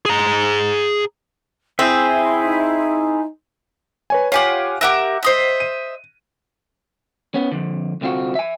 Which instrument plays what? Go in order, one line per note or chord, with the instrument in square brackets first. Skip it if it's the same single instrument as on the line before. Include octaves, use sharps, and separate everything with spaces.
[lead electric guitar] G#4 A#5
[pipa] C4 [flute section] E4 [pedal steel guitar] G#4 C5 E5
[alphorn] D#4
[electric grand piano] B4 C#5 G#5
[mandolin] F4 G4 F#5 [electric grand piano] C#5 G#5 D6
[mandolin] G4 A#4 E5 [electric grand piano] F#5 F#6 A#6
[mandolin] C5 D#5 E5
[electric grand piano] D#7
[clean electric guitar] B3 C#4
F2 D3
C2 D3 C4 D4 F4 F#4
E5 G#5